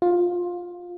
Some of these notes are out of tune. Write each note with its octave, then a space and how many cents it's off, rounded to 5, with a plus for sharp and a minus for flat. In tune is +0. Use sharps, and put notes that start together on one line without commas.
F4 +15